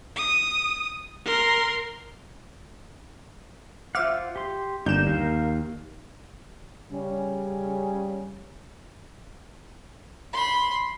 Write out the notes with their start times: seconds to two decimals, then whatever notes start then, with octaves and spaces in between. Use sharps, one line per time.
0.16 D#6
1.25 A#4 C6
3.95 F4 C5 E5 F#5 D6 F6
4.36 G4 C6
4.86 G1 A#3 D4 D#4 G6 E7
5.07 D#2 A#4 F5
6.91 C#3 G3 C#4
10.33 B5 C6